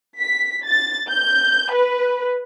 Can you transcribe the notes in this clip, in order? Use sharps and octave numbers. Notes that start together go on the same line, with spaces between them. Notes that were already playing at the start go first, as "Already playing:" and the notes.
B6
A6
G6
B4